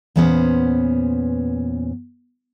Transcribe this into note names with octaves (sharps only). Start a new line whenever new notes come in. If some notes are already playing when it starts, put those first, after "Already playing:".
E2 A#2 B3 C#4 F#4 C5